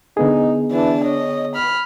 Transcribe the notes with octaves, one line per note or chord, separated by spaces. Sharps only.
D3 B3 D#4 G#4
E3 D4 A5
C#5 D#5
B5 F6